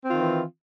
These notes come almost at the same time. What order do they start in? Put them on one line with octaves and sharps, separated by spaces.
C4 F4 D#3 E3